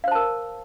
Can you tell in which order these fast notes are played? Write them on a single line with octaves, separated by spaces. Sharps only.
F5 C5 A5 A#4